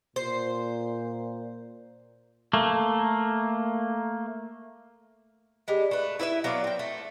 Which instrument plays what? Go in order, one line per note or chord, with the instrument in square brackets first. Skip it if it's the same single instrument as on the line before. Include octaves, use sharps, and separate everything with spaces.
[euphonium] A#2 [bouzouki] C5
[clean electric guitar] A3 A#3
[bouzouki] G3 G#3
A3 B4
E4 B4 D5 E5
F#3 B3 D5 F5
C4 G5
A3